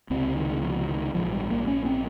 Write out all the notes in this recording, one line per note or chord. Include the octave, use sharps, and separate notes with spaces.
C#2 C3 C4
D#3
F3
D#3
A#1 G#2 F3
G3
A#3
C#4
C4